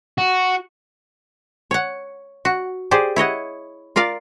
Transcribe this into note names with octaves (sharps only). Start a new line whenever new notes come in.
F#4
C#5 F#5
F#4
G4 G#4 C5 D5
E4 C#5 D#5 F#5
F4 A#4 D5 F5